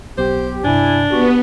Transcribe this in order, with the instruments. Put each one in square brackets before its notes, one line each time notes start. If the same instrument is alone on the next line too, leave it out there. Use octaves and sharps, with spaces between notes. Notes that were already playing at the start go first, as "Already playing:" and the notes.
[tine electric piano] B1 B3 [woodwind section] G4 [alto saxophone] C5
[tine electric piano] G2 C3 [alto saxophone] D4 [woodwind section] E4 G#5
[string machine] B3 [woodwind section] F#4 [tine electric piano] G4